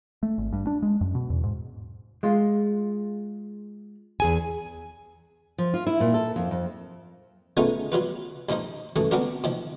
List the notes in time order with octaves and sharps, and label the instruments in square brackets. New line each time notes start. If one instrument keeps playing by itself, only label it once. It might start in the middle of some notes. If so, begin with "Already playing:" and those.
[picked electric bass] A3
G#1
G2
D4
G#3
F#2
B2
E2
G#2
[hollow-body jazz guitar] G#3 F4
[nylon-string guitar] E2 G#4 G#5
[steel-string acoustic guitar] F3
F4
E4
A#2
A4
F2
F2
[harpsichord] A3 B3 C#4 D#4 F4 G#4
F#3 G3 F4 B4
D#2 A#2 F3 D#4 C5
F#2 E3 A3 D#6
B3 C4 D4 F#4 A#4 C5
A#2 D#3 F3